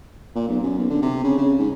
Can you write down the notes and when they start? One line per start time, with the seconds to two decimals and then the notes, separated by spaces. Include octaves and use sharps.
0.35 A#2
0.48 B1
0.63 F#2
0.78 B1
0.90 D3
1.02 C3
1.24 C#3
1.38 C#3
1.59 G#2